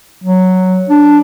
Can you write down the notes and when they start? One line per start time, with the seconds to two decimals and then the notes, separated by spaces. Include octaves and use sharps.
0.24 F#3
0.89 D4